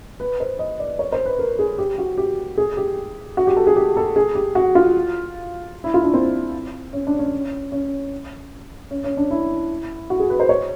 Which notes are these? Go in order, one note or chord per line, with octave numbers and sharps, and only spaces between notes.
B4
C5
D#5
D5
C#5
C5
B4
A#4
G#4
G4
F#4
G4
G#4
G4
F#4
G4
A4
G#4
G4
A4
G#4
G4
F#4
F4
E4
F4
D4
C4
C#4
D4
C#4
C#4
C#4
C#4
D4
E4
F#4
G#4
B4
C5
C#5